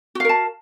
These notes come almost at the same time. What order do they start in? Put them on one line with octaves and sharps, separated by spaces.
F#4 F5 A#4 A5